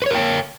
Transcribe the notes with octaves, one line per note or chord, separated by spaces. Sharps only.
A#4 B4 C#5 G5